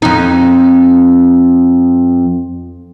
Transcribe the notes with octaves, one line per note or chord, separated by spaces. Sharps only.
F2 D#4